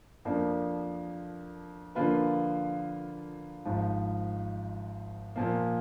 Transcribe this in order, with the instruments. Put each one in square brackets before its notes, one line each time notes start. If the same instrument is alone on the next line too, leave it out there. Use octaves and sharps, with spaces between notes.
[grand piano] F2 F3 A#3 D4
D3 F3 A#3 F4 B4
G#1 G#2 F3
A#2 F3 A#3